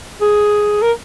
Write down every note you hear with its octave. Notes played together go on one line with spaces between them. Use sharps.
G#4
A#4